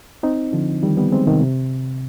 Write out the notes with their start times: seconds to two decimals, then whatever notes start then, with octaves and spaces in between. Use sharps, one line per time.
0.23 C4 D#4
0.53 D3 F3
0.83 D#3 G3
0.97 G3 B3
1.12 G#3 C4
1.27 C3 D#3
1.42 C3